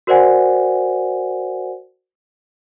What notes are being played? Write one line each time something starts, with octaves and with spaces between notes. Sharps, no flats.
F#4 A#4 C5 D5 F#5 G#5